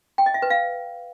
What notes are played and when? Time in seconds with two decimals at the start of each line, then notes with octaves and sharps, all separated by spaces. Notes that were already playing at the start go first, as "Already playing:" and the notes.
0.18 G5
0.26 D#5
0.34 E5
0.42 B4
0.50 F5